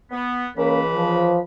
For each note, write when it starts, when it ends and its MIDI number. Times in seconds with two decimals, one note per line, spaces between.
0.11 0.47 59
0.57 1.43 37
0.57 1.43 52
0.57 0.81 58
0.57 0.81 61
0.57 1.43 83
0.94 1.39 53